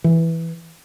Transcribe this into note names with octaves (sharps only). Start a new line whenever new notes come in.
E3